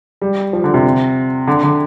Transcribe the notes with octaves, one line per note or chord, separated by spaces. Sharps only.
G3
F3
D3
C3
D3
D3